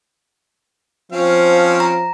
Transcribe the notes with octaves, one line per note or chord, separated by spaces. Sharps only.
F3 C4 C#4 F5
A#5